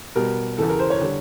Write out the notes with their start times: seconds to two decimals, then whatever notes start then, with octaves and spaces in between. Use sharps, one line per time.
0.16 B2 G3 A#4
0.58 E2 C#3 E3 A4
0.69 A#4
0.79 C5
0.90 C#5
1.01 D3 G3